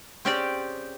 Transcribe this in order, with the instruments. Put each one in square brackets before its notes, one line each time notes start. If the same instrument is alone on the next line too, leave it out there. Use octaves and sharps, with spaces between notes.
[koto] C4 C#4 G4 G#4 C5 D5